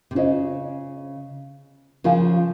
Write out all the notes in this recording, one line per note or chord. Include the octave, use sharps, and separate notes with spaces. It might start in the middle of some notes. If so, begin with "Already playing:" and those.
C3
C#3 C#4 F4 C5 D#5
C#3 F3 F4 A#4 F5 G#5